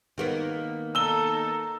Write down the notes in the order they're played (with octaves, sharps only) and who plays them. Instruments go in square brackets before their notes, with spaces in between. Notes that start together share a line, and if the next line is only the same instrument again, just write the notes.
[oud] D#3 A#3 B3
[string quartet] D#4 A4 [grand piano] E6 G7